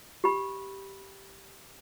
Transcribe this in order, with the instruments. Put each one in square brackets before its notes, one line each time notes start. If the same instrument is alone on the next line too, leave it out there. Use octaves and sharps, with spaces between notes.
[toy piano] G4 B5